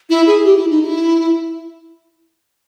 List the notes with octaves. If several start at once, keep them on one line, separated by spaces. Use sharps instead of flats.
E4
G#4
G4
E4
D#4
E4